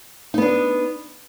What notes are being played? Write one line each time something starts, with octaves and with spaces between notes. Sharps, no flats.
B3 D4 D#4